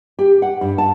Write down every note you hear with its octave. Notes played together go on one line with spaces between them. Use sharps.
G4
F#5
G2
A5